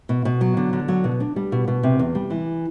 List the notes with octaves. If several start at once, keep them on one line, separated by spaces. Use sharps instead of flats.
B2
B2
F#3
D3
D3
F#3
B2
D4
G3
B2
B2
C3
E2
G3
E3